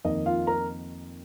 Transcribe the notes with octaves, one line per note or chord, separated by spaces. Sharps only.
F2 D#3 A#3 D#4 D#5
F4 F5
A#4 A#5